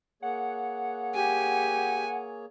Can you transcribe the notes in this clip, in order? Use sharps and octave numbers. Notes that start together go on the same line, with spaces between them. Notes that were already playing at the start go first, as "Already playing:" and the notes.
A#3 G#4 C#5 F#5
G4 G#5